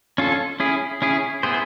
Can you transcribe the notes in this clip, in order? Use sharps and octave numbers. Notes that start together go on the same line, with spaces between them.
C#4 F4 A4
C#4 E4 G#4
C#4 E4 G#4
B3 E4 G#4 C5